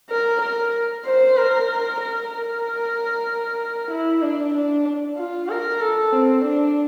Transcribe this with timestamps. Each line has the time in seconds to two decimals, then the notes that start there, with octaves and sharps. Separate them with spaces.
0.10 A#4
0.42 A#4
1.06 C5
1.37 A#4
2.01 A#4
2.32 A#4
3.92 E4
4.22 D4
4.55 D4
5.18 F4
5.50 A#4
5.81 A4
6.13 C4
6.45 D4